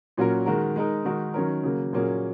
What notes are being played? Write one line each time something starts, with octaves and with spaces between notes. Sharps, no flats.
A#2 F#3 C#4 F#4 A#4
D#3 G#3 F#4 A#4
G#3 D#4 A#4
D#3 G#3 D#4 F#4 A#4
D#3 F#3 C#4 A#4
C#3 F#3 A#3
A#2 F#3 A#3 C#4 G#4